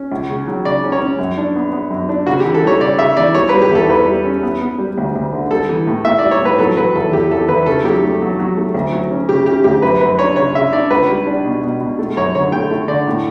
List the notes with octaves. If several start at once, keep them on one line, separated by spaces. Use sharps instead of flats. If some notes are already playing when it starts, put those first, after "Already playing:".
Already playing: C#4
C#2
C#3
F#3
C#3 D5
C#4
C#5
C#4
F#2
D4
B3
B3
F#2
D4
C#3 F#4
G4
E3
A4
G3 C#5
C#3 D5
C#3 E5
E3 D5
G3 C#5
G3 B4
G4
E2 A4
E2 B4
G3
C#4
B3
B3
G3
D2
D2
D3
G3 A4
E3
A2
A2 E5
G3 D5
C#5
A2
B4
F#3 A4
F#3 B4
E2 A4
E2 G4
E2 A4
E2 B4
C#3 A4
F#3 G4
A3
F#3
F#3
A3
D2
F#3
C#4
C#3 G4
C#4 G4
D2 G4
F#2 B4
F#2 B4
D4 C#5
C#3 C#5
C#3 E5
D4 D5
C#2 B4
G3
D4
B2
B2
B2
A3
F#2 C#5
D3 C#5
A3 G5
A3
D3 D5
A2